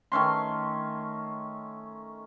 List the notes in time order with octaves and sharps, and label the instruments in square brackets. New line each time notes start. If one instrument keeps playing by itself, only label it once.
[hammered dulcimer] D#3 A3 C#4 C6